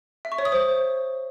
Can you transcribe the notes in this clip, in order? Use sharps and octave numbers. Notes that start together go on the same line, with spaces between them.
E5
C#6
C#5
D#6
C5